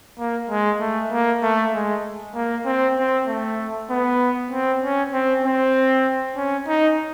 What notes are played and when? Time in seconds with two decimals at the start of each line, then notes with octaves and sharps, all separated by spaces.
0.18 A#3
0.50 G#3
0.80 A3
1.12 A#3
1.42 A3
1.74 G#3
2.35 A#3
2.66 C4
2.97 C4
3.27 A3
3.90 B3
4.51 C4
4.82 C#4
5.12 C4
5.44 C4
6.36 C#4
6.67 D#4